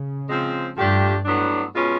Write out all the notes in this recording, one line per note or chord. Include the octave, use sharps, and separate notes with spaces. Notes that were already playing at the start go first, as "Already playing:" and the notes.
Already playing: C#3
F3 G#3 C4
G2 F3 A3 D4 G4
A2 F#3 B3 D4
B2 G#3 C#4 F4